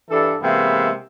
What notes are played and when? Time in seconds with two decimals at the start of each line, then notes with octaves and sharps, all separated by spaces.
0.11 G2 E3 D4 A4
0.41 C3 E3 G#3 A#3 B3 E5